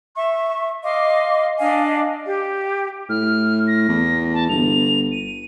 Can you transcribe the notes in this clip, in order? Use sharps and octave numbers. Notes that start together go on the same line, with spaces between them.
E5 C#6
D#5 F5 C6 D6
D4 D#5 F5 G#5
G4
A2 F6
A#6
E2
A5
G1 F7
D#7